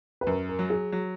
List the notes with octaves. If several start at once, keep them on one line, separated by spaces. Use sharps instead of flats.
B4
F#2 A#4
A#4
F#3
G#4
F#3